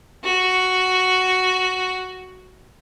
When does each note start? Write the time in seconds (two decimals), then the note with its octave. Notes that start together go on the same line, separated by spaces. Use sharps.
0.24 F#4